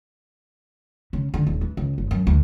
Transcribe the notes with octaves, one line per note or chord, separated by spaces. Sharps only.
C#3
D3
D#1
E3
C#2
G1
F#2
D2